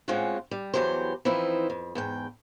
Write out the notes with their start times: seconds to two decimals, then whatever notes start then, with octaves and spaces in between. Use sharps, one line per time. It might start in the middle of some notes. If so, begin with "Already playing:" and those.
0.08 A2 G#3 C4 C#4 F4 F#5
0.51 G3
0.74 E2 E3 F#3 G4 C5
1.25 E3 F3 C4 D#4 E4
1.70 F2
1.95 E2 G#2 G5